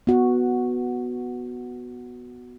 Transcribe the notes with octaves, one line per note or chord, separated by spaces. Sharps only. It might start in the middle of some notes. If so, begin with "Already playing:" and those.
B3 F#4